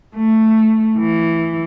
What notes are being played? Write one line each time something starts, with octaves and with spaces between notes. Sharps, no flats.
A3
E3